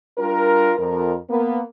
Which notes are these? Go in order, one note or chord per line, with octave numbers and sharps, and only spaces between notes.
G3 D4 F4 A#4
F2 A#4
A#3 B3